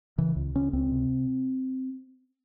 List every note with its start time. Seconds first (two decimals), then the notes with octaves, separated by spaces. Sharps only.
0.18 C#3 E3
0.36 C#2
0.55 C#3 C#4
0.73 C#2 C4
0.91 C3